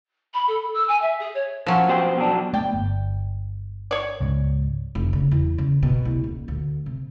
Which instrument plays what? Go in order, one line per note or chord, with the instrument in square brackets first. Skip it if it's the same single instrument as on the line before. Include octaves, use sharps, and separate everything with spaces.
[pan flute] B5
A4
E6
G#5
E5
G#4
C#5
[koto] F3 F#3 C#4
[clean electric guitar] B2 C5 G5
B2 F#3 D4
[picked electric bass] A3 B3 [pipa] D5 G5
[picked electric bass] G1
[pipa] C#5 D5
[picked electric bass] C#2 G#2 C#3
[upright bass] F1
C#3
E2
C#3
B2
C2
D#1
D2
C3